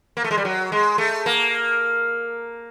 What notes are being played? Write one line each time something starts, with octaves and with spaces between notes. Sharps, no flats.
A#3
A3
G#3
G3
F#3
G#3
A3
A#3